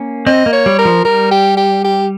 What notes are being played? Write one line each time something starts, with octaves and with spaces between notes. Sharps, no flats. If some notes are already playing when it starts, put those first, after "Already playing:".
Already playing: A#3 C#4
C4 D#5
A#3
C#5
G3
A#4
F3
G3 A#4
G4
G4
G4